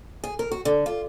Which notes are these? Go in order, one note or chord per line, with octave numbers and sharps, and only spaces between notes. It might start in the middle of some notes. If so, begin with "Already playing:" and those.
G#4
A#4
F#4
D3
F4